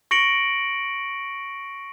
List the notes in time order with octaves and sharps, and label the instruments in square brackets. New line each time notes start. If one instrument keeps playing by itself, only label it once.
[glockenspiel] C#6 A#6 C#7 D7 F#7